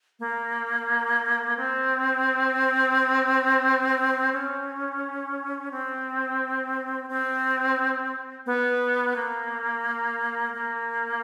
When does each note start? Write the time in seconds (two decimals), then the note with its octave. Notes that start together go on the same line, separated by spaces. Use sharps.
0.20 A#3
1.57 C4
4.32 C#4
5.71 C4
7.09 C4
8.46 B3
9.16 A#3
10.53 A#3